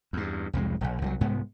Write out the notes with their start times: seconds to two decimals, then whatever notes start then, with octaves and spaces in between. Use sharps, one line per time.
0.13 E2 G2
0.53 C2 F2 A2 G#3
0.81 D#1 A#1
1.02 C2 F3 F#3
1.21 C2 G#2 G#3 B3